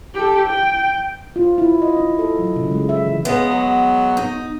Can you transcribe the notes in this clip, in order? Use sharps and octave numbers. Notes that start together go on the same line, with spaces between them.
G4 A4
G5
F4
E4
D#5
D#4
A4
F#3
C#3
G#3
E5
E3
C#3 G#3 B3
F#3
D#4